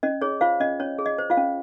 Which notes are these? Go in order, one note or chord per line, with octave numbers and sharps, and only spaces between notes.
C#4 D#5
G#4 C#5
F4 C5 F5
C#4 D#5
C#4 C#5
G#4
D#5
C5
F4 F5
C#4